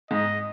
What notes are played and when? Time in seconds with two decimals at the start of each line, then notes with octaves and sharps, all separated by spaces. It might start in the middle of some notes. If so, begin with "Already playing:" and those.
0.11 G#2 D#5